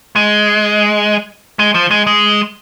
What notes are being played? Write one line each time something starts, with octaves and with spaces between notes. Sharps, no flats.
G#3
G#3
F3
G#3
G#3